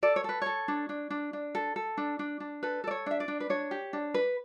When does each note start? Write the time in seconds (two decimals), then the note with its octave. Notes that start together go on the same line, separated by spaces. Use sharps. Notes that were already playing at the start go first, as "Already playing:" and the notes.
0.03 A4 D5
0.16 C#5
0.24 A4 B4
0.42 A4 C#5
0.68 D4
0.89 D4
1.10 D4
1.33 D4
1.55 A4
1.76 A4
1.97 D4
2.19 D4
2.40 D4
2.63 A4 B4
2.84 A4 D5
2.91 C#5
3.06 D4 E5
3.20 D5
3.28 D4
3.40 B4
3.50 D4 C#5
3.71 G4
3.93 D4
4.14 B4